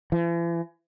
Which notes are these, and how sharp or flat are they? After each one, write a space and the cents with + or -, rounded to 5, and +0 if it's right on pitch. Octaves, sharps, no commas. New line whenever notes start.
E3 +45